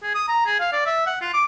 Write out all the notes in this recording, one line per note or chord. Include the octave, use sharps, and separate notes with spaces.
G#4
D#6
A#5
G#4
F5
D5
E5
F#5
F4
D6